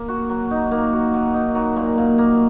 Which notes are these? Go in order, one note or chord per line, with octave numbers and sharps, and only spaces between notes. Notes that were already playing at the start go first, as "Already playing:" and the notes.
Already playing: A#3
F#4
F#3
D#4
A#3
F#4
F#3
D#4
F#3
A#2
A#2
A#3